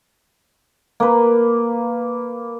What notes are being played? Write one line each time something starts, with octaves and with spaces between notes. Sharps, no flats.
A#3 B4